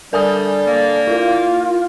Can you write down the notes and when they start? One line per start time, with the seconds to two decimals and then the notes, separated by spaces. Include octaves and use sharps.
0.13 D3 G3 A#4 G#5 D#6
0.66 A#3 D5
1.07 E4 F4 A#4